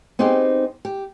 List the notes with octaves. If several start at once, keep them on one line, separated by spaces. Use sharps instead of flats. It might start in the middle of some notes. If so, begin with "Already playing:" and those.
B3 C4 D#4 G4 G#4 C5
G4